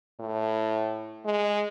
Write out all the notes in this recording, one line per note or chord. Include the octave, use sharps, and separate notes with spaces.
A2
G#3